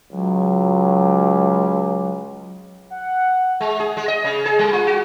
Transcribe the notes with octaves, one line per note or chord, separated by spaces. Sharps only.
C#2 F#3
F#5
G#3
G#4
G#3
D#5
C#3
G#4
G3
F4
F#4